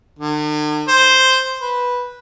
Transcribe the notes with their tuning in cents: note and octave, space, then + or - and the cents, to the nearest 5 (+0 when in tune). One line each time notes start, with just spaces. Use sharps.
D3 +45
C5 +0
B4 -10